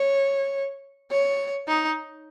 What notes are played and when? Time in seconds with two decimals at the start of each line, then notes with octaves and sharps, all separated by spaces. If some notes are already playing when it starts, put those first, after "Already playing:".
Already playing: C#5
1.11 C#5
1.68 D#4